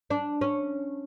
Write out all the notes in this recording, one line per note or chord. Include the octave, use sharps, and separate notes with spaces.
D4
C#4